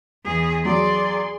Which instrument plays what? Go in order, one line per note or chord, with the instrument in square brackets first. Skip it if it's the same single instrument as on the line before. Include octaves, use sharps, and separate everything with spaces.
[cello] E2 G#4
[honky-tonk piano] F#3 [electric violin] G#4 C6 [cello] D5